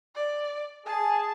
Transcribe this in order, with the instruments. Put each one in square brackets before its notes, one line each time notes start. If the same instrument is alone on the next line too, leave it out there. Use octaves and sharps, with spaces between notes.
[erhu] D5
[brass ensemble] G#4 [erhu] A5